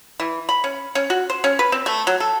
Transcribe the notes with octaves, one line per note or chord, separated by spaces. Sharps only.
E3
B5
C#4
C#4
F#4
C5
C#4
B4
C4
A3
F#3
A4